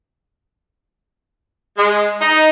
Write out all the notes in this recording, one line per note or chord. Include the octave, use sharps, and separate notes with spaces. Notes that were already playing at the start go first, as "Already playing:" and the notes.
G#3
D#4